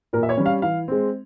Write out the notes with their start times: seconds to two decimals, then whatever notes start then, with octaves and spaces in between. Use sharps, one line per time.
0.13 A#2 A#4
0.23 E5
0.29 C#5
0.37 G3 C#4
0.46 F5
0.62 E3 F5
0.88 G#3 C4